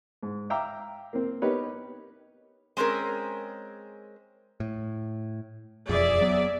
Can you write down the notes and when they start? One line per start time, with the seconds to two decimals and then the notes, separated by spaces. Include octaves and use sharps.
0.23 G#2
0.50 E5 F5 G5 A#5 D6 E6
1.13 A#3 C4
1.42 B3 D#4 G4 A#4 B4 C#5
2.77 G#3 C4 C#4 G#4 A#4
4.60 A2
5.89 E1 F2 G#4 D5 E5
6.21 F#3 B3